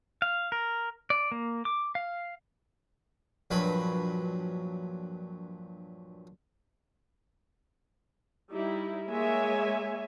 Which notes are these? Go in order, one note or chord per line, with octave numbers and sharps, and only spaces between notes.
F5
A#4
D5
A#3
D6
F5
A#1 G2 F#3 B4 B5
G3 D#4 E4
G#3 A#3 C#5 E5 G#5